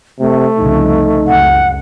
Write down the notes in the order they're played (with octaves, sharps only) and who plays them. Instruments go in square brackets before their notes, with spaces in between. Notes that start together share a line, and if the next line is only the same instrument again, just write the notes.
[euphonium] C3 [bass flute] A3
[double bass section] C2 F2 C#3 [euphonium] D#4
[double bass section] C#2 F#2 [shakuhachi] F#5